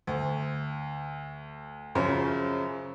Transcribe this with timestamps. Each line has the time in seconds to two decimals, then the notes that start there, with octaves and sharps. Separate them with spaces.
0.07 D2
1.95 F#2 C#3 F3